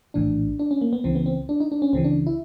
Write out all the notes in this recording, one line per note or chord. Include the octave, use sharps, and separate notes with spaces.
A#1 A2 E3 D4
D4
C#4
A#3
B3
C#2 C#3 E3 C4
B3
C4
D4
D#4
D4
C#4
C#2 C#3 E3 C4
D4
E4